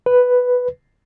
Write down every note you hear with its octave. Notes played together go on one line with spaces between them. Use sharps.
B4